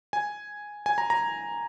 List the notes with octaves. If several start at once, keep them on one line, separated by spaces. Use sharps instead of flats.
G#5
G#5
A#5
A#5